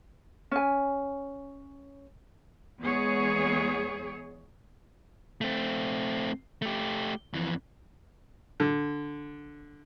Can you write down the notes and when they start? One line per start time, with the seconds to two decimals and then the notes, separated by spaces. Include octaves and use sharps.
0.51 C#4 G#5
2.82 E2 G#3 B3 G#4 C#5
5.41 A3 C4
6.62 A3 G4
7.34 F2 E3
8.60 D3